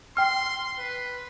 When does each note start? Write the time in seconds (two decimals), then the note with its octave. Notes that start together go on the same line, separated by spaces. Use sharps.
0.17 G5 C6 F6
0.79 B4